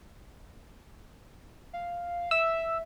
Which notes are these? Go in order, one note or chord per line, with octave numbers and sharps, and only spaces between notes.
F5
E5 E6